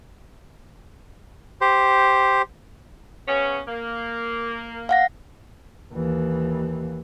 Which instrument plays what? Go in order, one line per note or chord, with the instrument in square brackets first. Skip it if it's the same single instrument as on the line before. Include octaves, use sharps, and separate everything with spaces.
[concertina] G4 C5
[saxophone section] C#3 B3 C#4
A#3
[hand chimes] F5 F#5 A#6
[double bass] D#2 E3